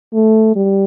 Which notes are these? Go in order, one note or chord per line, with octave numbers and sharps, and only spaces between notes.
A3
G3